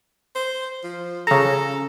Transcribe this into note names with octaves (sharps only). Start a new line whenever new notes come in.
C5
F3
C#3 A4 A#5